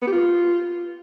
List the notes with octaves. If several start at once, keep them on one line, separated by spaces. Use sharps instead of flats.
B3
G4
F4